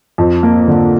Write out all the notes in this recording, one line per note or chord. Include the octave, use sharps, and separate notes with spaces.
F2
A#3
D3